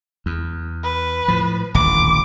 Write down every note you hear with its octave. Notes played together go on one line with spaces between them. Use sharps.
E2
B4
A2 F3
D#1 A1 D2 D6